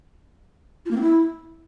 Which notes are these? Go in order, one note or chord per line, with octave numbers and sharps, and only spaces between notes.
F4
A#3
C4
E4